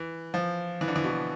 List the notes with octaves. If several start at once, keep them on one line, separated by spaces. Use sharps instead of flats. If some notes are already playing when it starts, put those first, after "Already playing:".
Already playing: E3
F3
E3
D3
E3
B2